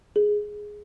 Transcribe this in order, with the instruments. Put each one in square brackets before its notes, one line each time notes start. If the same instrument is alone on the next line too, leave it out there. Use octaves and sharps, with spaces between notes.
[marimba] G#4